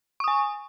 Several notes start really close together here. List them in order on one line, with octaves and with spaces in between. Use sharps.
C#6 D#6 G#5